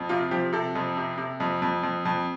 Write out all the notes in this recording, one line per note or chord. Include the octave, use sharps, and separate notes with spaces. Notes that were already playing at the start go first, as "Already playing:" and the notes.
Already playing: F2
C3 F4
F3 G4
C3 A4
F2
C3
C3
F2
F2
F2
F2